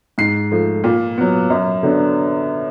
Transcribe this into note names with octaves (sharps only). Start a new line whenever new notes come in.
G#2 C7
F3 A3
A#2
F#3 B3
F#2
D3 F#3 B3 D4